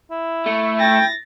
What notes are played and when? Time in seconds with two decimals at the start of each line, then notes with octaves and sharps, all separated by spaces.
0.11 E4
0.46 A3
0.80 G5 A6 A#6